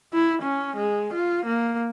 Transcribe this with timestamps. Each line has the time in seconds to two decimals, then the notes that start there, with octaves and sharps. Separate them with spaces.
0.14 E4
0.42 C#4
0.77 G#3
1.14 F4
1.46 A#3